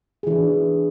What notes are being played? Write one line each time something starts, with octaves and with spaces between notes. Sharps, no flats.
E3 D4 G#4